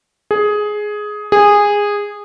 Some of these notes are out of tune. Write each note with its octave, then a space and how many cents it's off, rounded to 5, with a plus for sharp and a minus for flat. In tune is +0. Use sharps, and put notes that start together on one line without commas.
G#4 +10
G#4 -15